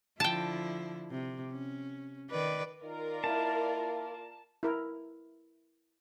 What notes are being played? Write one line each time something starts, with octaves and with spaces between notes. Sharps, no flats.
D3 F3 E4 G5 A5
C3
C#4
D#3 B4 D5
D#3 F4 A#4 D5
A#3 D#4 E4 A5
E4 A#4